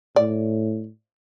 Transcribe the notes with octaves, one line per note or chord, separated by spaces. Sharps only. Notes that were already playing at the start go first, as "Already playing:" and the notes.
A2 D5